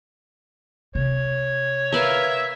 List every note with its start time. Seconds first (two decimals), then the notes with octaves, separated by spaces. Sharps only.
0.95 C3 C#5
1.92 A#4 B4 E5 F5